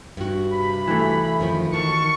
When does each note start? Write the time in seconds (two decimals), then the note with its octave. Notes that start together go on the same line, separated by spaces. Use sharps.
0.17 G2 F#4
0.52 C3 B5
0.87 E3 A3
1.40 F#2 D#3 F3
1.74 D#3 F#4 A#4 A5 C#6